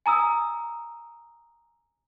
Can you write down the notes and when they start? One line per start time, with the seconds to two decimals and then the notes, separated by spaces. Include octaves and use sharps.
0.06 G#5 A#5 D#6 E6